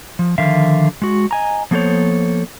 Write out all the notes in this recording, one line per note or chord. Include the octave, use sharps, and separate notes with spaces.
F3
D3 D#3 F3 E5 F5
G#3 F#4
D#5 G#5 A#5
F3 A#3 B3 A4 C5 C#5